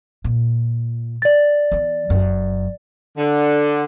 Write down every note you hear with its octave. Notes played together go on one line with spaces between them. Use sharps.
A#2
D5 A6
E3 B3
F#1 F#2
D3